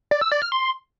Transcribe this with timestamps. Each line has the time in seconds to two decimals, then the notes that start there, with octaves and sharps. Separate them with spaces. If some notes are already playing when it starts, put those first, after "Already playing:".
0.11 D5
0.21 E6
0.32 D5
0.42 F6
0.52 C6